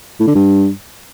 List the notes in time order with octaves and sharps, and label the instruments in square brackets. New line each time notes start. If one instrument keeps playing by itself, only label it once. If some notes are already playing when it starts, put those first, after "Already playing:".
[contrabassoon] A2
D3
G2